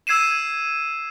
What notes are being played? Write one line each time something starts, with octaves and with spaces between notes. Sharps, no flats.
E6 G#6 C7 D#7 E7